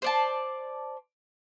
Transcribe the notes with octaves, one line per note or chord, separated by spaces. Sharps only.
C5 D5 A5